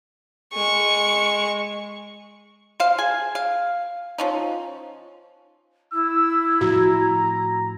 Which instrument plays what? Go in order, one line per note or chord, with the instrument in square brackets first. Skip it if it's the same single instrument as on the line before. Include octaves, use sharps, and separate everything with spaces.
[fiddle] G#3 C#6
[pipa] C5 F5
G#4 G#5
F5
F3 C#4 D#4
[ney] E4 [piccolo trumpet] E6
[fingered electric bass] A2 F3 C4 [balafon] F#4 [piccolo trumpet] A#5